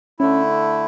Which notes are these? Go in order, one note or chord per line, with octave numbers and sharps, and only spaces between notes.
D3 A3 C#4 E4